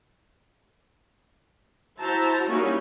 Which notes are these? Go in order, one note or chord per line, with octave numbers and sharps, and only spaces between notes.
E4 F#4 C5 A5 A#5
G3 A#3 C#4 D#4 E4 F#4